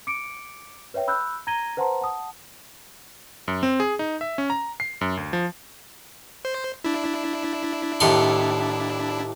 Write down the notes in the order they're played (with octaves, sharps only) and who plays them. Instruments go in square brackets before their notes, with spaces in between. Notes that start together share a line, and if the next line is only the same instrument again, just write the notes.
[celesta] D6 C#7 D7
B4 C#5 E5 G5
B5 E6 F#6 G6
A#5 G#6 A#6 D#7 G7
B4 C5 F#5 A5 A#5 C6
F#5 A5 D#6
[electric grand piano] F#2
C4
G#4
D#4
E5
C#4
A#5
C7
F#2
D2
F3
[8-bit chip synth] C5
D4 E4
[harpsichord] D#2 A2 C6